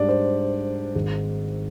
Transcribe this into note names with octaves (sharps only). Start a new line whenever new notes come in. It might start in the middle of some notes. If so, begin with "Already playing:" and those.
Already playing: G#2 G3 D4 D5
C5
G#1 G#2 D#3 G#3